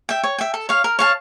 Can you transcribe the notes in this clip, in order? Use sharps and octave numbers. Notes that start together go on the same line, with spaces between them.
E5 G5
C#5
E5 G5
A4
C#5 F5
A#4
C#5 F5 A5